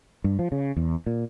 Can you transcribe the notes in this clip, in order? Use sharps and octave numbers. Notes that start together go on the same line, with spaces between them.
G2
F3
C#3
E2
A#2